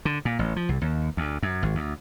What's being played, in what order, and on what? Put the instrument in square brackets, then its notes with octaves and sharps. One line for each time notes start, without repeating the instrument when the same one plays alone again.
[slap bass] D3
A#2
A1
F3
C2
D#2
D2
F#2
G#1
D2